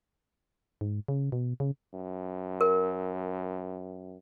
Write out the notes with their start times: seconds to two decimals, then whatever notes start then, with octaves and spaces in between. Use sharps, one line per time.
0.81 G#2
1.08 C#3
1.32 B2
1.60 C#3
1.93 F#2
2.61 A#4